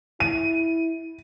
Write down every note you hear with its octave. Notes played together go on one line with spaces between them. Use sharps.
E4 D#7